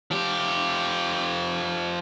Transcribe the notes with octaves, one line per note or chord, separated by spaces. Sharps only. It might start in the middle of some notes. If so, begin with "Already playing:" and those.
F3 G4